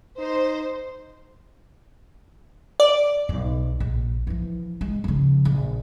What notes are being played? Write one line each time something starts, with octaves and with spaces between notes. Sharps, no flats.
D#4 C5
D5
B1
A#1
E3 F3
G#3
C#3 F3
A#1